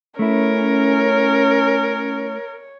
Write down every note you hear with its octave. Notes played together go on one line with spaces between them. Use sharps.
A3 C#4 E4 A#4 C#5